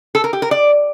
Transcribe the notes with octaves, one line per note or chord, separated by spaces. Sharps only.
A4
A#4
G4
A#4
D5